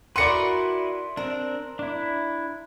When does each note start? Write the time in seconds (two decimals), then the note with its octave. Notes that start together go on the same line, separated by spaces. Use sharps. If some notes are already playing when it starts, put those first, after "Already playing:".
0.16 E4 F#4 A#4 B4 D5 C6 C#7
1.17 C4 D4 A#4
1.79 D4 E4